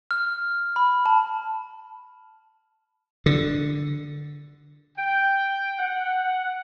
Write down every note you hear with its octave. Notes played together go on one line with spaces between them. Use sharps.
F6
B5
A5
D3
G5
F#5